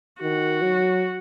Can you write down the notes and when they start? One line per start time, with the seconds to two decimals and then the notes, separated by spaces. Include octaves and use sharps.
0.20 D#3 F#4
0.62 F#3